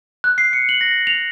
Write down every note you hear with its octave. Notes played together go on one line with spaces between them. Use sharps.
F#6
C7
C#7
F#7
A#6
F7